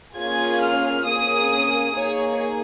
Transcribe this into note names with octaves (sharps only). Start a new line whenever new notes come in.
A#3 C#4 F4 G#4 G#6
F6
A#3 C#4 G#4 D#6
A#3 D#4 G#4 C#5